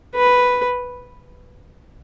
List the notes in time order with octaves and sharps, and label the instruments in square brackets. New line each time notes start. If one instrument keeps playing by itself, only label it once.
[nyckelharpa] B4